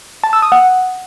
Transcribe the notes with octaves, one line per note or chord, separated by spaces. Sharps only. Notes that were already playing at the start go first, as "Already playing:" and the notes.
A5
E6
D#6
F#5